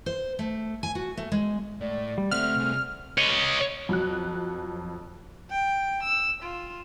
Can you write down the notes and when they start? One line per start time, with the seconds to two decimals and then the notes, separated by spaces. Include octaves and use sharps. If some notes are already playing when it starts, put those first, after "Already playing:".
0.06 C5
0.39 A3
0.83 G#5
0.95 F#4
1.17 A3
1.32 G#3
1.81 A2 A3 D5
2.18 G3
2.31 D2 A3 C4 E5 F#5 F6
2.57 C2 G#4
3.18 C#5 D#5
3.89 F2 F#3 F#4 F#6
5.50 G5
6.02 E6
6.41 F4